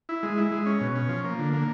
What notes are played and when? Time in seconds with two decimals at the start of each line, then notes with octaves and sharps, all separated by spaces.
0.09 E4
0.23 G#3
0.37 E4
0.52 G#3
0.66 C#4
0.81 B2
0.95 C#4
1.09 F3
1.24 A#3
1.39 D3
1.53 A#3